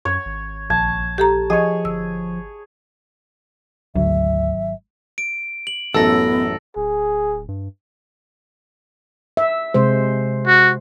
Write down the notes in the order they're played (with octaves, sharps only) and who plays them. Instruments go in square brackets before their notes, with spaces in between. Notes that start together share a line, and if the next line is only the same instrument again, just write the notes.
[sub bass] F#2 [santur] C#5
[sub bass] G#1
[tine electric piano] A#1 G#6 [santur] A5
[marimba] G4 A4 A#5
[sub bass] F3 [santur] G#4 C#5 [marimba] D#5
[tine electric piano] G1 [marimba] E6
[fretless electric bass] G#1 F#3 [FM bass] D2 [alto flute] E5
[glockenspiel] D7
F#7
[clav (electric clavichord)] A1 F#2 [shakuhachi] B3 [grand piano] A4 [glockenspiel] E6 A#6
[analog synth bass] D1 [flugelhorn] G#4
[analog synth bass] G2
[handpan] E5
C3 G#3 C5
[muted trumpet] F#4